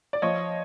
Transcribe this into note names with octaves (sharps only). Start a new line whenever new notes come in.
D5
F3 C#5 D#5